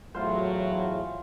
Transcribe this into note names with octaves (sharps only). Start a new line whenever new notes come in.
E2 A2 F#3 A3 F4 C5